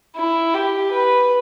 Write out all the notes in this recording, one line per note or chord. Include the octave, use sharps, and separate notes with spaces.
E4
G4
B4